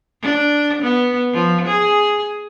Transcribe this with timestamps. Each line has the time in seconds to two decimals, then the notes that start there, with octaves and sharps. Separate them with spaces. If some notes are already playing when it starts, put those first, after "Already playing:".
0.22 D4
0.82 B3
1.33 F3
1.67 G#4